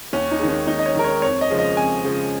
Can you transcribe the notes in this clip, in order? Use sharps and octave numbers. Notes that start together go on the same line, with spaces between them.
D#2 C#4
D#4
D#3 G#3
C#4
D#2 D#4
D#5
C#5
D#3 G#3 A#4
C#5
F2 C#5
D#5
C#3 F3 G#3
D#5
F2 G#5
C#3 F3 G#3